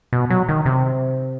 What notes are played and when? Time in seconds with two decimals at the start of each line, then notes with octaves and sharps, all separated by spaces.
0.13 B2
0.30 F#3
0.49 D#3
0.66 C3